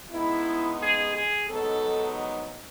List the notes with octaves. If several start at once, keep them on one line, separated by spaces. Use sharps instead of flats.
C#3 G#3 B3 D#4 E4
G#4
G#4
G#2 F#3 B3 D#4 A4